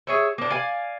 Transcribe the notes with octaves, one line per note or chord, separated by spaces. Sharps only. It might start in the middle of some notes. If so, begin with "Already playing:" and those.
G#4 C#5 E5
A#3 D4
D5 F5 G#5